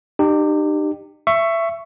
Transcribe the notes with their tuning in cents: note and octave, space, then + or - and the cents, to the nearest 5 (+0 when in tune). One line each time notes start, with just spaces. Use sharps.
D#4 -45 G4 +0
E5 +20 C#6 +0